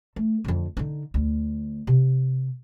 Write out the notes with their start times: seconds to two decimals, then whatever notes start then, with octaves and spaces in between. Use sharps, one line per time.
0.16 A3
0.44 F2 D3
0.77 D3 D#4
1.14 D2
1.87 C3